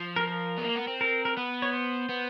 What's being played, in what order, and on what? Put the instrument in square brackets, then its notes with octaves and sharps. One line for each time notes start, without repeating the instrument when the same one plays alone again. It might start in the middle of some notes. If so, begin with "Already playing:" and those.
Already playing: [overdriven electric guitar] F3
[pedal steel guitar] A#4
A#4
[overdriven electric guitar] B3
A#3
B3
C4
[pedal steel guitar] A#4
A#4
[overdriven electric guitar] B3 [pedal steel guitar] B4
[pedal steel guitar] C#5
C5
[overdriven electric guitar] B3